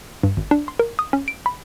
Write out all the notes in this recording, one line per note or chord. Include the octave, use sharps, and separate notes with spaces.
G2
G#1
D4
C6
A#4
D#6
C#4
D7
B5